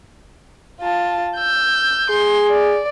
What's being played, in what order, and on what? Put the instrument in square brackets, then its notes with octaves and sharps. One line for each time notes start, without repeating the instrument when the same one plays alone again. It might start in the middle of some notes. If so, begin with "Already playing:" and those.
[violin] F4 A5
E6 G6
[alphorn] G#4 [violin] C6
[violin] D5